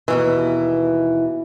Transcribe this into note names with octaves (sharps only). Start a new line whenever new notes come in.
D#2 B2 E3